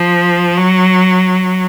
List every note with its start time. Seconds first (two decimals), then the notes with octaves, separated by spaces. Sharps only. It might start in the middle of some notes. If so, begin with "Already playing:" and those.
Already playing: F3
0.57 F#3